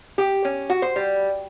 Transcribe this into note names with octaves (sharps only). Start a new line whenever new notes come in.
G4
C#4
F#4
C5
G3